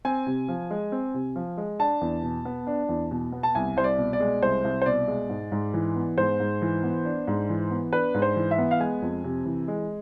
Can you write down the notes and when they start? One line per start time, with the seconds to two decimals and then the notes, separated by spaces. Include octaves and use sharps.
0.05 C4 G#5
0.27 C3
0.48 F3
0.71 G#3
0.92 C4
1.14 C3
1.36 F3
1.57 G#3
1.80 D4 A5
2.01 E2
2.23 B2
2.45 B3
2.67 D4
2.89 E2
3.11 B2
3.32 B3
3.43 A5
3.55 C2 G#5
3.76 C2 C5
3.84 D5
3.98 B2
4.13 D5
4.20 G#3
4.42 C2 C5
4.64 C2
4.82 C5
4.86 B2 D5
5.08 G#3
5.29 G#2
5.52 G#2
5.74 E3
5.96 B3
6.18 G#2 C5
6.40 G#2
6.62 E3
6.83 B3
7.05 D4
7.28 G#2
7.49 E3
7.71 B3
7.93 D4 B4
8.14 G#2
8.22 C5
8.36 E3
8.51 E5
8.58 B3
8.71 F5
8.80 G#3 G#5
9.02 F2
9.24 C3
9.45 E3
9.68 G#3